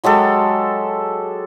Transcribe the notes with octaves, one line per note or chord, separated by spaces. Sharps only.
F#3 G#3 G4 A4